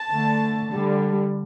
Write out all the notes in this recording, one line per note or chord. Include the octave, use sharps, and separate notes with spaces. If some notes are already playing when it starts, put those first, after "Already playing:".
Already playing: A5
D3 A3
D3 G3